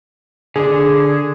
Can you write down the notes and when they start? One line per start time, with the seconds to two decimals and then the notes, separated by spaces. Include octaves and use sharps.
0.56 D3 D4 G#4